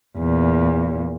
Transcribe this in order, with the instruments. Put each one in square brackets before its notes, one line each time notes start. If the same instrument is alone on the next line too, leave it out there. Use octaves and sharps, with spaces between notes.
[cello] E2 A#2